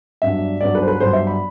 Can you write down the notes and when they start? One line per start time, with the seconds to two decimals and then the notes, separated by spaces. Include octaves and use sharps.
0.22 G2 F#3 B3 D4 E5
0.61 G2 F#3 B3 D4 D5
0.75 B4
0.82 C5
0.88 B4
1.00 G2 F#3 B3 D4 C5
1.13 E5
1.27 B5